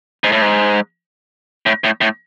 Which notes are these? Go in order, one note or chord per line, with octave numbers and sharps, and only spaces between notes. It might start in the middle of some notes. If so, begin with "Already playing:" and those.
G#2
A2
G#2
A2
A2
A2